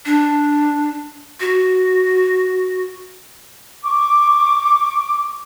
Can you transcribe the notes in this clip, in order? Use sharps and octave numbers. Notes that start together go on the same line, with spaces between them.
D4
F#4
C#6 D6